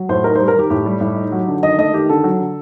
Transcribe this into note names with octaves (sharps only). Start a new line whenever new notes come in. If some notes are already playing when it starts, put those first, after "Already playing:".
Already playing: F#3
A2 C5
D#4 A#4
G3 C5
A#4
D#3 G4
A2 G4
G3
A2
D#4
F#3
D3
D#3 D#5
A3 D#5
D#3 G4
D3 A4
F#3
D3